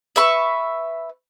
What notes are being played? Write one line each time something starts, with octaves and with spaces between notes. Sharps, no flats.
B4 E5 C#6